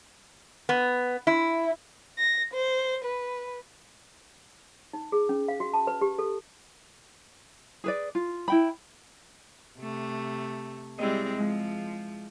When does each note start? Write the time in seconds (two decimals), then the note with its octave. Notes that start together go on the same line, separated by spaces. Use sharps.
0.69 B3
1.27 E4
2.18 A#6
2.54 C5
3.05 B4
4.93 D#4
5.12 G#4
5.29 C#4
5.48 F5
5.60 F#4
5.74 A5
5.87 B4
6.01 G4
6.19 A4
7.84 G#4 B4 D5
8.15 F4
8.48 E4 G5 B5
9.79 C3 A3
10.99 G3 G#3 C4 E4 D#5
11.38 F3 G#3